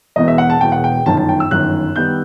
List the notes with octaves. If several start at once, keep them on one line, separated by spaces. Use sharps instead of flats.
E1 E2 B2 D#5
E5
F#5
A5
E1 E2 B2 G5
F#5
G5
G1 F#2 D#3 A5
A5
G5
E6
G1 F#2 D#3 F#6
D#3 G3 B3 D#4 G6